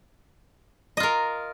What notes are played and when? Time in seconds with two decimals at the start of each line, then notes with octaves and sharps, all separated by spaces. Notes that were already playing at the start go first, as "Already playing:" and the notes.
0.97 D#5
1.00 F4
1.03 A#4